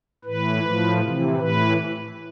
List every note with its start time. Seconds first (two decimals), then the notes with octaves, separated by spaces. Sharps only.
0.24 A2 E3 B4
0.63 A2 F3
1.01 C3 E3
1.39 A2 E3 B4